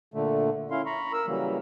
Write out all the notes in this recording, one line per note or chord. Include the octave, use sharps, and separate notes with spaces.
A#2 D3 A3
C#4 E4 F5 C6
A#5 B5 C#6
A#4 E6
C#3 E3 F#3 G3 A#3